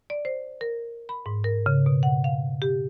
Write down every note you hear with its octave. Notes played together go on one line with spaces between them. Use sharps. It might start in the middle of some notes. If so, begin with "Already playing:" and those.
D5
C5
A#4
B5
G#2
A#4
C#3
B2
F#5
F5
G4